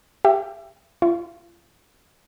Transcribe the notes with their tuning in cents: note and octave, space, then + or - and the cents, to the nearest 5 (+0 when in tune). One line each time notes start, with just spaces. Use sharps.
G4 +0 E5 +30
F4 -40 C#6 +0